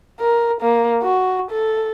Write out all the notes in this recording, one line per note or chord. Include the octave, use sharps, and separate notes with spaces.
A#4
A#3
F#4
A4